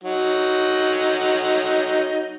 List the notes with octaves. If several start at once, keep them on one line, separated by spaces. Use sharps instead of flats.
F#3 D#4